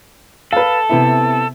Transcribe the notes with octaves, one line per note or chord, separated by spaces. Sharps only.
A4 B4 F5
C3 B3 E4